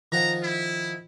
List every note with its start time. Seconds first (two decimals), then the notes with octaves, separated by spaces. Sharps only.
0.12 D#3 F3 F#5 A#5
0.43 E4